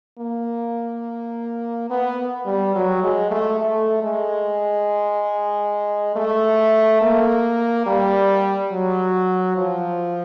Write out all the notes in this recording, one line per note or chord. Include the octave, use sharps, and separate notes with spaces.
A#3
B3
G3
F#3
G#3
A3
A3
G#3
A3
A#3
G3
F#3
F3